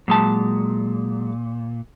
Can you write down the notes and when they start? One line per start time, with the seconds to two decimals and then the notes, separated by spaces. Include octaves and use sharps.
0.08 A#2 F#3 G#3 A5